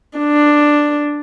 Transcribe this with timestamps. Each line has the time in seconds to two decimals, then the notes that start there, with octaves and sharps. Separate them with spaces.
0.18 D4